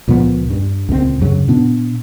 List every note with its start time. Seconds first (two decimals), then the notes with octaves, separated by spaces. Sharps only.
0.07 C#2 A#2 F3 B3
0.50 G2
0.89 C#2 A#2 D#3 C4
1.21 F#2 C#3 F#3
1.48 A#2 B3 D4